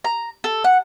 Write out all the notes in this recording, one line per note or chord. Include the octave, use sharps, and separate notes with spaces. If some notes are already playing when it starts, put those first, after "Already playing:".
A#5
A4
F#5